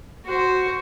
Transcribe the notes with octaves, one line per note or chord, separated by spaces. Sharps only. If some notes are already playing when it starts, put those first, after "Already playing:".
F#4 C5